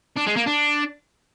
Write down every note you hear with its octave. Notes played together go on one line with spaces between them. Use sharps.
D4
G#3
A#3
D4